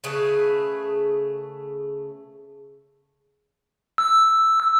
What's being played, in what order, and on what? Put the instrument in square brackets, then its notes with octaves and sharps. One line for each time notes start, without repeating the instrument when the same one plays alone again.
[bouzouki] C#3 A3 G#4 B4
[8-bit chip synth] E6